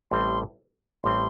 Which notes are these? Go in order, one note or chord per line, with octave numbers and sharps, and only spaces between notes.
A1 A2 G3 C4 C6
A1 A2 G3 C4 C6